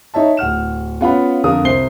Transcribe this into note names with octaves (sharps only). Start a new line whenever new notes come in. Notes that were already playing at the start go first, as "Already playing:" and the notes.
D#4 C#5 E5 A5
D1 F#5 F6 E7
B3 C#4 F4 F5 F#5 B5
F2 D3 D4 A#4 F5 D#6
C2 C5 C7 G7